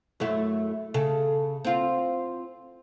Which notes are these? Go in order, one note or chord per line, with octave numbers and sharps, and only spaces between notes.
F#2 A3 E4
C#3 A4
C4 F4